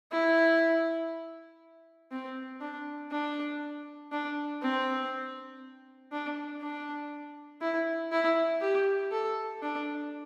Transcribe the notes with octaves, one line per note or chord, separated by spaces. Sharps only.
E4
C4
D4
D4
D4
C4
D4
D4
E4
E4
G4
A4
D4